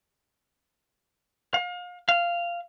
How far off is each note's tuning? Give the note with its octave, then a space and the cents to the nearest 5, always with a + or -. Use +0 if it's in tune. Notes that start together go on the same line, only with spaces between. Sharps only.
F5 +35
F5 -10